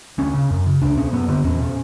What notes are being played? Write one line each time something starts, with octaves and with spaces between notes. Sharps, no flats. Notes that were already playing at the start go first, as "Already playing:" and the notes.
D2 C#4
C#3
F#2
C#3
C#2 D4
B2 C#4
F#2 B3
D3 B3
E2 C#4
B2